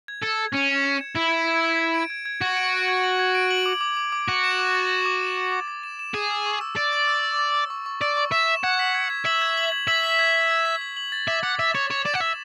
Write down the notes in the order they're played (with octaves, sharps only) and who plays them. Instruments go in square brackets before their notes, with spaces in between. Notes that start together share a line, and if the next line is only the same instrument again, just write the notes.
[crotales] G#6
[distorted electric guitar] A4 [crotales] G#6
[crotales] G#6
[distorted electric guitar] C#4 [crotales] G#6
[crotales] E7
C#7
G#6
[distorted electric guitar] E4 [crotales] G#6
[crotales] G#6
G#6
G#6
G#6
D7
G#6
G#6
[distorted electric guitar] F#4 [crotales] G#6
[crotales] D7
D7
G#6
F#7
G#6
D7
F#7
D6
D6
D6
D6
[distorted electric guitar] F#4 [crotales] D6
[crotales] E7
D6
A6
E7
D6
E7
D6
D6
A6
E7
E7
[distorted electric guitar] G#4 [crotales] E7
[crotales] E6
C#6
E6
[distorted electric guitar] D5 [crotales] E6
[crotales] A6
E6
E6
A6
E6
C#6
C#6
[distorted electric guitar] D5 [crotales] E6
[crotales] C#6
[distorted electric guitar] E5 [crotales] E7
[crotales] E7
[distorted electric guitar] F#5 [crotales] G#6
[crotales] B6
G#6
G#6
[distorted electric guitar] E5 [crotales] F#7
[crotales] G#6
F#7
G#6
[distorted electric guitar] E5 [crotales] F#7
[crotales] B6
G#6
B6
G#6
B6
F#7
F#7
A6
[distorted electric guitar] E5 [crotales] D6
[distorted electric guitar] F#5 [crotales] D6
[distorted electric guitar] E5 [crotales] E7
[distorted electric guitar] C#5 [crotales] A6
[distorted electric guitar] C#5 [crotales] E7
[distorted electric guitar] D5 [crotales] E7
[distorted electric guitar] F#5
[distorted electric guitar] E5 [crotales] D6